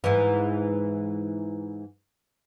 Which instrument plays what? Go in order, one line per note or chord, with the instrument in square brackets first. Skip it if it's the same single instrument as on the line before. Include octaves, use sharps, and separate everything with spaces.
[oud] G#2 E3